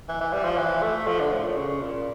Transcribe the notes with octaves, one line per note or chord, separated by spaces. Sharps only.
E3
E3
G3
F3
E3
A3
F3
D3
A2
A#2
C#3
A#2